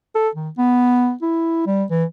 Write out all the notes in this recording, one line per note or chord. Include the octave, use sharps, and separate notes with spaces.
A4
D#3
B3
E4
G3
E3